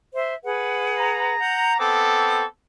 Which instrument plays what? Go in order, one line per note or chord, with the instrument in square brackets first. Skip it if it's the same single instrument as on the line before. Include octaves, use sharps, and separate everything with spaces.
[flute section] C5 E5
G#4 B4 F#5
[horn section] A#5
[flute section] F#5 G6
[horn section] B3 C4 A4 [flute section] D6